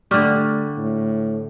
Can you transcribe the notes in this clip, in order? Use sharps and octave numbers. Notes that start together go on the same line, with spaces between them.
D3 G3 A3 C#6 D6 F6
A2